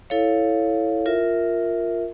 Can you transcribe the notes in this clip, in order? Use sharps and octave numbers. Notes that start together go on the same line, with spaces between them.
E4 A4 C#5 F5
F4 A#4 E5